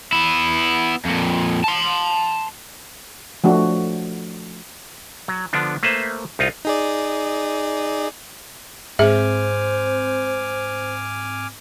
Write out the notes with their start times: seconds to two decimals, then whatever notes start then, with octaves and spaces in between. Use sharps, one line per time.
0.13 B3 E4
1.05 F2 A#2
1.64 A5 C6
3.44 F3 A3 D4 F#4
5.28 F#3
5.53 D3 F3 B3 D4
5.83 A3 A#3 B4 C5 E5
6.39 C2 D#4 F4
6.65 D#4 G#4 D5
8.99 G#2 C4 G#4 C5 E5 G#5 D6 F6